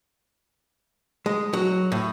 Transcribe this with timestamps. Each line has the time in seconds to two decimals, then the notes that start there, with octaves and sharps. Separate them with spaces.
1.26 G#3
1.53 F#3
1.92 A2